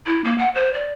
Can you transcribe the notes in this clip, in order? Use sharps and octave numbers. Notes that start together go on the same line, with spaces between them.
E4
A#3
F#5
C5
D5